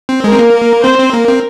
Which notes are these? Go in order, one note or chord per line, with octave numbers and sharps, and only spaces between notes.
C4
G#3 A#4
C4
A#3
C4 C5
C4
A#3 A#4
C4